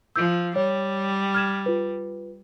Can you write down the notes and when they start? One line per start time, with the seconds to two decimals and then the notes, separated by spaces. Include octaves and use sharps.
0.16 F3 E6 G6
0.56 G3 C#5
1.35 F6 G#6 E7
1.66 F4 B4